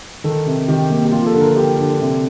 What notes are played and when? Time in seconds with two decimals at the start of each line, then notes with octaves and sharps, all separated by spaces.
0.24 D#3 A4
0.47 C3
0.68 D#3 G4
0.90 A#3
1.05 G4
1.12 F3 F4
1.26 A4
1.34 D3
1.41 A#4
1.56 D3 G4
1.79 D3
2.01 C3